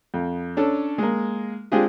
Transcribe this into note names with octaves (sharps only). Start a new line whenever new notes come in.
F2
C#4 D4 A4
G#3 A#3
G#3 C4 D4 F4 G4 G#4